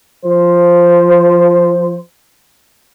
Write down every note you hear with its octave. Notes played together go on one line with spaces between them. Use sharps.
F3 C5